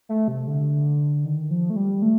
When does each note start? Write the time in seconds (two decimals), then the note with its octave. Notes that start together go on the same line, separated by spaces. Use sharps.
0.09 A3
0.28 C3
0.47 D3
1.25 D#3
1.51 F3
1.70 A3
1.76 G3
2.02 A3